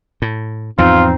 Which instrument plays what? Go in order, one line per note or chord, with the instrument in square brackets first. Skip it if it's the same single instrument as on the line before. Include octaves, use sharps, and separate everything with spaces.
[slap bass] A2
[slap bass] E2 G#2 F3 [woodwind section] C4 D#4 [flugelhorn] F4